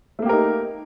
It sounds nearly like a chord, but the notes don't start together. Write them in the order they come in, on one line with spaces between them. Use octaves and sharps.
A3 A#3 G4 A#4 D#4